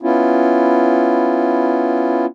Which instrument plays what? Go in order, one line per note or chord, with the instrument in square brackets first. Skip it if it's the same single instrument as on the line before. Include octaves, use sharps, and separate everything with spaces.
[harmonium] B3 C#4 E4 F4